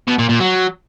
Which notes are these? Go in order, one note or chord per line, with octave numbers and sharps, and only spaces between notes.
B2
A#2
A#2
F#3